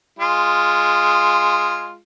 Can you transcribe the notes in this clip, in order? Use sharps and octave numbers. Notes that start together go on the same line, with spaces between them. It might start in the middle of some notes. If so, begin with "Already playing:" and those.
G#3 F4